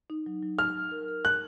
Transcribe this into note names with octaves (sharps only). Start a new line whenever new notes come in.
D#4
F#3
F#3
F#3 F6
F#3
A#4
A#4
F#3 F#6